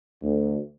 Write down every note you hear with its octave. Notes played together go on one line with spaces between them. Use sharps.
D2